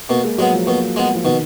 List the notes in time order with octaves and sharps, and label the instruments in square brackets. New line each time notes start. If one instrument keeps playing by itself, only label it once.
[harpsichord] B2 [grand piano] A#3
[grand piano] G#3
[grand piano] F#3 [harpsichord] G#3 B3
[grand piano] F3
[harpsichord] B2 [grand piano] A#3
[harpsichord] G#3 B3
[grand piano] F3
[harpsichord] B2 [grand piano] D#3